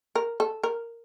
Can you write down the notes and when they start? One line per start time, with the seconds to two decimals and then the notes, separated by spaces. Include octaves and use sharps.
0.15 A#4
0.40 A4
0.63 A#4